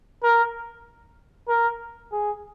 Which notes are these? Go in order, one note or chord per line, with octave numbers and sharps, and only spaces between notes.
A#4
A#4
G#4